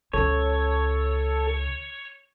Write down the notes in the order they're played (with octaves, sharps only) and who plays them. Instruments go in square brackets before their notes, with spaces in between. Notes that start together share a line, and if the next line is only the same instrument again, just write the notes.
[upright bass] C#2 C#3 [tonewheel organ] A4 [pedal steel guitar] C#5